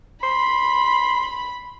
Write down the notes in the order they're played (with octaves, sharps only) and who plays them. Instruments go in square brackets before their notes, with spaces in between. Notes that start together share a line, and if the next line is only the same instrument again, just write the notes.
[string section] B5 [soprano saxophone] C6